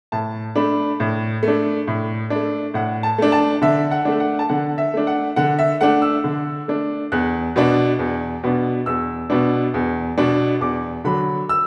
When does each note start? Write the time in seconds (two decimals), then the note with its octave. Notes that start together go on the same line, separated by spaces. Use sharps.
0.12 A2 A5
0.55 A3 D4 B5
1.00 A2
1.43 A3
1.48 D4
1.88 A2
2.30 D4
2.36 A3
2.74 A2 F#5
3.03 A5
3.18 A3 D4
3.32 A5
3.62 D3 E5
3.91 F#5
4.05 A3 D4
4.20 F#5
4.39 A5
4.49 D3 F#5
4.78 E5
4.94 A3 D4
5.07 F#5
5.36 D3 F#5
5.59 E5
5.81 A3 D4 F#5
6.02 E6
6.24 D3
6.68 A3 D4
7.12 E2 F#6
7.56 B2 B3 D4
7.99 E2
8.43 B2 B3 D4
8.86 E2 E6
9.30 B2 B3 D4
9.74 E2
10.18 B2 B3 D4
10.61 E2 D6
11.05 D3 F#3 B5
11.49 E6